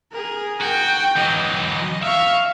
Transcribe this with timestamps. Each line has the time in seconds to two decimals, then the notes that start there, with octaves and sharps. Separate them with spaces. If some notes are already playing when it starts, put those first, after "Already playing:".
0.11 G#4 A#4
0.61 F#4 G5
1.16 E3 F#3 D#5
2.02 E5 F5 C#6